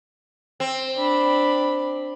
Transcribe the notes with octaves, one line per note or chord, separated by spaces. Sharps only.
C4
D4 B5